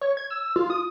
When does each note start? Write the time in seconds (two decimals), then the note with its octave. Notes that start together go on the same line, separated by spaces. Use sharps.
0.01 C#5
0.17 G#6
0.30 E6
0.56 F4
0.70 D#6